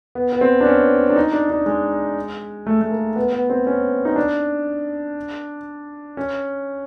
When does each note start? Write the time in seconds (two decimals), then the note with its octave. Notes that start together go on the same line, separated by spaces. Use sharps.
0.15 B3
0.32 B3
0.41 C4
0.61 D4
0.66 C#4
1.10 D4
1.16 D#4
1.32 D4
1.50 D4
1.66 G#3
2.66 A3
2.81 A3
2.91 A#3
3.16 B3
3.33 B3
3.50 C4
3.67 C#4
4.05 D#4
4.16 D4
6.17 C#4